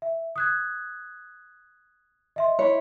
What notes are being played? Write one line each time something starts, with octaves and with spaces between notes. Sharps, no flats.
E5
D#6 F#6 G#6
D#5 E5 C6
E4 C#5